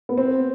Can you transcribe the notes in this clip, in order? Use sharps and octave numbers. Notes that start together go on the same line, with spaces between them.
B3
C4